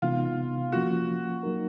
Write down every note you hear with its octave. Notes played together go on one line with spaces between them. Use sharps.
C3 E3 G#3 B3 D#4 F4
F3 A#3 C#4 F4 F#4
F#3 A#3 D#4 F#4 A#4